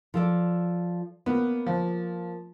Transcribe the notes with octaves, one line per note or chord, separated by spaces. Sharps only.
F3 A4 D5
A#3 B3 C#4
F3